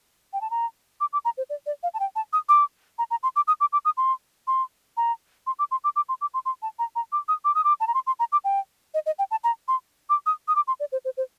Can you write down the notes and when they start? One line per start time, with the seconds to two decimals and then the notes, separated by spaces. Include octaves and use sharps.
0.33 G5
0.41 A5
0.51 A#5
1.00 D6
1.13 D6
1.25 A#5
1.38 C5
1.50 D5
1.66 D5
1.83 F5
1.94 A5
2.00 G5
2.16 A5
2.33 D#6
2.49 D6
2.99 A#5
3.11 A#5
3.23 C6
3.36 D6
3.48 D#6
3.60 D6
3.73 D6
3.85 D#6
3.97 C6
4.47 C6
4.97 A#5
5.47 C6
5.59 D6
5.71 C6
5.84 D6
5.96 D6
6.09 C6
6.21 D6
6.34 C6
6.46 C6
6.62 A5
6.79 A#5
6.96 A#5
7.12 D6
7.28 D#6
7.45 D6
7.55 D#6
7.64 D6
7.80 A5
7.87 A#5
7.94 C6
8.07 C6
8.19 A#5
8.32 D6
8.44 G5
8.94 D#5
9.06 D#5
9.19 G5
9.31 A5
9.44 A#5
9.68 C6
10.10 D6
10.26 D#6
10.48 D#6
10.56 D6
10.67 C6
10.80 D5
10.92 C5
11.05 C5
11.17 C5